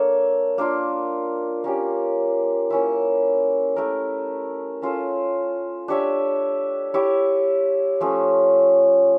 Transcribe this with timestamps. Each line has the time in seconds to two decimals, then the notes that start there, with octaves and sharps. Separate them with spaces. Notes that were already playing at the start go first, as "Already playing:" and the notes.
Already playing: A#3 D4 A4 C#5
0.58 A#3 D4 F4
1.64 A#3 C#4 G4
2.70 A#3 C#4 E4
3.76 A3 E4 A#4
4.82 C#4 F4 A4
5.88 D4 G4 C#5 E5
6.94 E4 G4 C#5
8.01 F3 A3 C#4